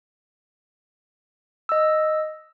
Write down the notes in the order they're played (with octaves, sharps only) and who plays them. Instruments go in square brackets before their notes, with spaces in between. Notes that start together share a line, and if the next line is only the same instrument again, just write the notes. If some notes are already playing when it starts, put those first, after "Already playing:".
[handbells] D#5 E6